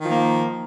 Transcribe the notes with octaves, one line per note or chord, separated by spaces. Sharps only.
D#3 F3 A#3